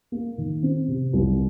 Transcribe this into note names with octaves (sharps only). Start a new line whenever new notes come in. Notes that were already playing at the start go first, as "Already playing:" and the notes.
A#3
D#3
C4
C3
C2